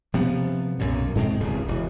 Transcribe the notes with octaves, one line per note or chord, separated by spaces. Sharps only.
C3 F3 B3
B1 F#2 A#2
G#2 G#3 C4
D1 C#2
E1